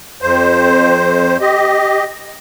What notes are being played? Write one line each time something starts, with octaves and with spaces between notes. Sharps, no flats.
F2 C5
G4 D#5